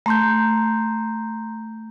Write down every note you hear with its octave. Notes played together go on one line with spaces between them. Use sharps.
A3 A#5 C6 G6